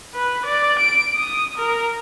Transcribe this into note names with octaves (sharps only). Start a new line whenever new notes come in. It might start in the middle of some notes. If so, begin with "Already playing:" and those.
B4
D5
D7
D#6
A#4